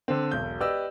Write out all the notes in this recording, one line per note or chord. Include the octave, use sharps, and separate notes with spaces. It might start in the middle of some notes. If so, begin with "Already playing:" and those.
D3 C4
E1 B1 G6
G4 B4 D5 D#5 E6